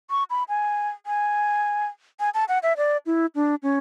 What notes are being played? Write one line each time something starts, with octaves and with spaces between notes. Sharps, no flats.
C#6
B5
G#5
G#5
G#5
A5
F#5
E5
D5
E4
D4
C#4